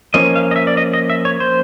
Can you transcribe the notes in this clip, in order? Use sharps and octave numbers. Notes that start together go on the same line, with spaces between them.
F3 A#3 C#4 D#5
F5
D#5
E5
D5
D#5
D#5
E5
C#5
C5